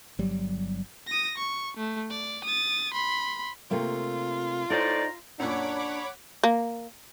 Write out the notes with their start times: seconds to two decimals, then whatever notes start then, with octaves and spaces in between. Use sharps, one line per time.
0.19 G1 F#3 G3
1.07 D#6 A#6
1.38 C#6
1.77 A3
2.10 D5
2.45 D#6 A6
2.94 B5 C6
3.71 C3 A3 A#3 F4
4.70 A2 D#4 C5 D5 A#5
5.40 F#2 A#2 D4 C#5 F#5 B5 D6
6.44 A#3